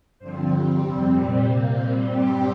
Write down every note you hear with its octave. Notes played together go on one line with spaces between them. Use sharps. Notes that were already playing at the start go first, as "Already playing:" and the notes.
G2 D3 F3 C4 C5
G2 G3 C4
F2 C3 G3 C4
A#2 G3 C4
C3 A#3 C5
A#2 G3 C4 C5
G2 G3 C4 G4